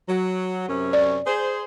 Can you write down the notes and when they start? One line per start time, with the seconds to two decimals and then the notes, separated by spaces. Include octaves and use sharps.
0.08 F#3
0.69 F#2 C3 C#4
0.93 D5
1.26 G#4 C5